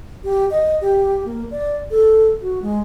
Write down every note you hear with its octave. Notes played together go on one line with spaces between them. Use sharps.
G4
D#5
G4
A#3
D5
A4
F#4
G#3